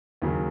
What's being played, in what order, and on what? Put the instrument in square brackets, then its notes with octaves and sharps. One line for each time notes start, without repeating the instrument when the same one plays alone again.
[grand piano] D#2 C#3 F#3